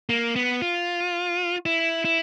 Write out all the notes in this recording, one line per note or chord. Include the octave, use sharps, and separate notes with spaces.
A#3
B3
F4
E4
E4